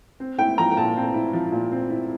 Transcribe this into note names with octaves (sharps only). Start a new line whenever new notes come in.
C4
E4 G5
F3 A#5
G5
A#2 A5
C4
E4
F3
A#2
C4
E4